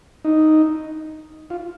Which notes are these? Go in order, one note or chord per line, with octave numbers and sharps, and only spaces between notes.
D#4
F4